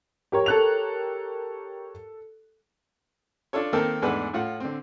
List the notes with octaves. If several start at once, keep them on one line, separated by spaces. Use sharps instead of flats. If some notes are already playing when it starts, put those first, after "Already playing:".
G4 A#4 C#5
A4 F#6 F7
D4 F4 A4 C#5
D#3 A#3 C4 A4 A#4
E2 G#2 A3 D4 B4 F#5
A2 F4 F#5
D3 C4